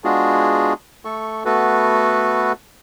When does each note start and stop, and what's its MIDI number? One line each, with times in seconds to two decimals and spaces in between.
0.04 0.73 56
0.04 0.73 59
0.04 0.73 62
0.04 0.73 65
0.04 0.73 66
0.04 0.73 68
1.05 1.43 57
1.05 1.43 69
1.05 1.43 85
1.45 2.52 57
1.45 2.52 59
1.45 2.52 66
1.45 2.52 69
1.45 2.52 71